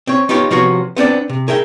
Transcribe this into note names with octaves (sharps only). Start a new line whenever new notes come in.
C4 C#5
B3 D#4 F4 G4 C#5
C3 F3 B3 F#4 C#5
B3 C4 D4 D5
C3
G#4 A#4 E5 G5